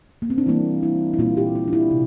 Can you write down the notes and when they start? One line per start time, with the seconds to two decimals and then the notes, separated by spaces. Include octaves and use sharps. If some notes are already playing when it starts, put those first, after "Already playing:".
0.22 A#3
0.30 C4
0.38 D4
0.46 E3 G3 A#3 E4
0.83 E4
1.13 E4
1.19 A#2 G3 A#3 F4
1.37 G4
1.55 F4
1.68 D4
1.73 E4
1.91 C3